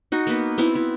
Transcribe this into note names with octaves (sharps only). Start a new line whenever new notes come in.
D#4 F#4
A#3 B3 B4
B3 C4 E4
E4